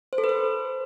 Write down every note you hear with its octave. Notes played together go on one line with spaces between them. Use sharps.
C5
A4
B4
C5